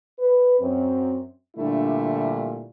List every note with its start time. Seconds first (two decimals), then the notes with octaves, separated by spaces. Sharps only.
0.19 B4
0.60 F#2 C4
1.57 A#2 D3 G3 A3 D4 E4